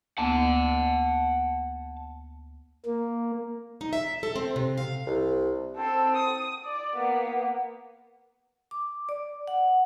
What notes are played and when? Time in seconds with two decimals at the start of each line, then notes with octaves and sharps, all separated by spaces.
0.18 D2 A#3 B3 F#5 A5
2.86 A#3
3.81 D#4
3.93 E5
4.23 A4
4.36 C4
4.56 C3
4.77 F5
5.07 C2
5.77 C4 A4
6.17 D#6
6.65 D5
6.96 A#3 B3
8.71 D6
9.09 D5
9.47 F#5